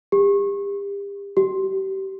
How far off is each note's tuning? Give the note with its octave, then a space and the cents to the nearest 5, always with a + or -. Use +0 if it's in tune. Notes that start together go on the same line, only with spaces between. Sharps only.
G4 +40
G4 -30